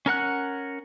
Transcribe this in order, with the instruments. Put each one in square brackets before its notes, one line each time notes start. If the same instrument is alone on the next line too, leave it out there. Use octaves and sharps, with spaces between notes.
[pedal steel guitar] C#4 A#4 F#5 F#6